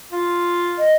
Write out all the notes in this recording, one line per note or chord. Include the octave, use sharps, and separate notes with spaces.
F4
D#5